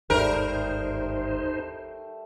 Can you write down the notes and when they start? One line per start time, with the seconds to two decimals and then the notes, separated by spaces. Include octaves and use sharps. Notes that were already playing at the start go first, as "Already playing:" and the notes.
0.10 G1 D#2 G#2 G3 A3 D#4 A#4 C5